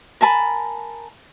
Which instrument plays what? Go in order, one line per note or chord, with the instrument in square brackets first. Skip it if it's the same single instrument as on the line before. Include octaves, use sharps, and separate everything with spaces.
[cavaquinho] A#4 G#5 A5 B5